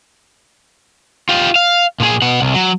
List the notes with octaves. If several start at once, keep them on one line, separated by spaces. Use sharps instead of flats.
F4 G4
F5
A#2 G#4
B2 F#5
C2
F#3